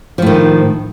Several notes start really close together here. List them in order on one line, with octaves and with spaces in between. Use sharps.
F3 A2 D#3